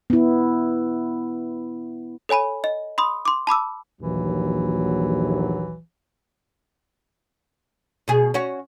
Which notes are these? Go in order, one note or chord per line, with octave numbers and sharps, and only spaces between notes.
B3 E4
A4 C#5 G#5 B5 D#7
D#5
B5 C6 D#6
C6 D6
A5 B5 D6 E6
A#1 D#2 E3 F#3
B2 G#4
C#4 F#4